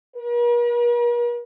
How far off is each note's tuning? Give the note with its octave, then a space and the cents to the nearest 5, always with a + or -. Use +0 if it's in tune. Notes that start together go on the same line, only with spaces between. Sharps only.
A#4 +45